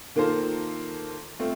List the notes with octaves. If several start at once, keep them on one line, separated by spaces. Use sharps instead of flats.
D#3 A#3 F4 A4 C5
A3 C4 F4